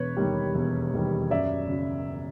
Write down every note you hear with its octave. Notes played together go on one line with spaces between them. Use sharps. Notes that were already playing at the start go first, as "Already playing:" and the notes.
Already playing: E1 B4 C#5
D#2 D#3 G3
E1
D#2 D#3 G3
F#2 D5 E5
C#3 F#3